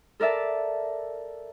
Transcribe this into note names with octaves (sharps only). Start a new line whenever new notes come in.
A4 A#4 D5 E5 A5